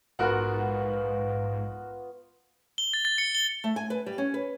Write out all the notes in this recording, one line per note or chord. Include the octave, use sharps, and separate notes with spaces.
A#1 G#2 B3 F4 F#4 A#4 F#5 C#6
G7
A6
A6
C#7
G7
A3
G#5
B4
G3
C#4
B4